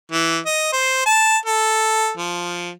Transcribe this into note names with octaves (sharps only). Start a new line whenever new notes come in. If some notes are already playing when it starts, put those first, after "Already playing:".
E3
D#5
C5
A5
A4
F3